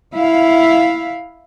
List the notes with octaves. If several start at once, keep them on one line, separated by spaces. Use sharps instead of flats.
E4 F5